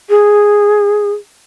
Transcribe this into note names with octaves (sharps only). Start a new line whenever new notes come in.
G#4